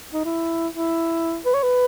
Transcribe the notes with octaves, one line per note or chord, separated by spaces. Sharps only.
D#4
E4
E4
B4
C#5
B4